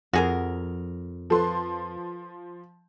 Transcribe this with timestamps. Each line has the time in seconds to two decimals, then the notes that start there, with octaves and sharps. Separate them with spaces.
0.13 F2 F#4 G#4 A#4 F#5
1.30 F3 A4 B4 C6